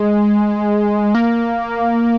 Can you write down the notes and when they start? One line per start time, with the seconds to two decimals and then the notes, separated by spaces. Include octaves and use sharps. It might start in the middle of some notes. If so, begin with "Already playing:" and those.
Already playing: G#3
1.15 A#3